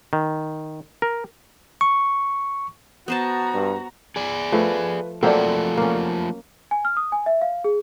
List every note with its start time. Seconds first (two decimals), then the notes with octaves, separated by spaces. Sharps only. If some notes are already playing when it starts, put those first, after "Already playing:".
0.13 D#3
1.02 A#4
1.81 C#6
3.08 B3 F#4 C5 A5 A#5
3.54 G2
4.16 G#4 D5
4.52 F3 A3 B4
5.23 F3 F#3 A3 A#3 C4 A4 D5
5.77 A#3 C#4
6.71 G#5
6.85 F6
6.97 D#6
7.12 G#5
7.26 E5
7.41 F5
7.64 G#4